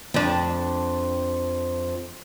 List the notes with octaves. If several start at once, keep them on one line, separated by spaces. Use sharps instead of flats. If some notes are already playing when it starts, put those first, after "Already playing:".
F2 D4